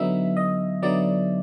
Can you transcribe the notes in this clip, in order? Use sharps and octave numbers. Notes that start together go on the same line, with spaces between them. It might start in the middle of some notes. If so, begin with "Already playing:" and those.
Already playing: D3 F#3 B3 D#4 E5
D#5
D3 F#3 B3 D#4 D5